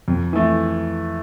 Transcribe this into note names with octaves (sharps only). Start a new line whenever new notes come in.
F2
E3 A3